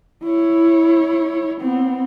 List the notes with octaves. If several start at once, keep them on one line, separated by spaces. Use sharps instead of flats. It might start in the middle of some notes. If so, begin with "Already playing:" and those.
E4 C#5
B3 C4